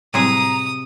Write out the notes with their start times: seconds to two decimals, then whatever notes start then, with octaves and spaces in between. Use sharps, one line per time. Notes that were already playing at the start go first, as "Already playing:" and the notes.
0.14 A2 C3 F#3 G3 G#4 A#5 D#6